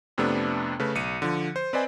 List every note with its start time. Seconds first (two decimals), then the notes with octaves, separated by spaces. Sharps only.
0.18 F2 C3 A3 B3 D4
0.80 C#3 A3 B4
0.95 B1 C#7 D#7
1.22 D3 F3
1.56 C5
1.73 C4 B4 C5 D5 D#5 G#5